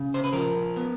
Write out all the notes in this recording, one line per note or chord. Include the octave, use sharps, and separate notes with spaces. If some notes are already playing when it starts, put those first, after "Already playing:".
Already playing: C#3
C5
B4
F3 A#4
B3